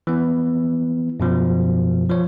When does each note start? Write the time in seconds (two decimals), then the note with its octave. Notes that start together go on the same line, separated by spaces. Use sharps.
0.07 E3 B3
1.20 F#2 B2 F3
2.10 F3 C#5